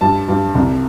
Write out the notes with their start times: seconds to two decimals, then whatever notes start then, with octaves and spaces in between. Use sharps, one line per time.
0.01 G2 A5
0.28 G2
0.55 C2